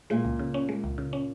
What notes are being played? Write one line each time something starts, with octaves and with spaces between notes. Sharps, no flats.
A#2 G#3
C#2
C#3
C#4
G#3
C#2
C#3
C#4